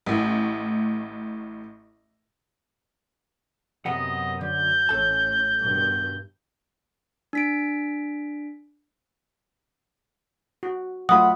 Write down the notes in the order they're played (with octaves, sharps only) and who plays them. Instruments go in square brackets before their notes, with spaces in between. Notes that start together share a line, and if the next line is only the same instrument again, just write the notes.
[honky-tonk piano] A1 A2
[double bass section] F#2 [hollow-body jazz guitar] C3 B3 F#5 [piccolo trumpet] D#5
[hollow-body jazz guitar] D3 [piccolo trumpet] G6
[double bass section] A1 A2 C#4 [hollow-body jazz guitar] A4 A5
[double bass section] G2 B2 D#3
[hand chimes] D4 B6 D7
[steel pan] F#4
[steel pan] F#3 A3 F4 [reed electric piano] F#5 B5 [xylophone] D#6